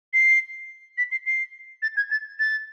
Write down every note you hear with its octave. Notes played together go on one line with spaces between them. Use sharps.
C7
B6
C7
C7
A6
G#6
A6
A6